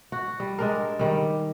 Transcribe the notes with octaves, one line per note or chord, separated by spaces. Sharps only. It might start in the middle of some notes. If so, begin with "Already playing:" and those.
F#4
G3
G#3 D4 A#4
D#3 G3